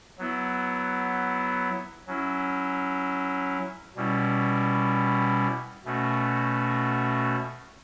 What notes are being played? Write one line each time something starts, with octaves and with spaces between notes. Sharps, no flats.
F#3 B3 E4
F#3 C#4 E4
B2 G3 C#4 E4
B2 A3 C#4 F#4